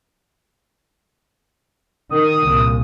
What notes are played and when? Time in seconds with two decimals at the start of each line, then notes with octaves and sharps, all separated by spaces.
2.10 D#3 D#6
2.43 C2 A#2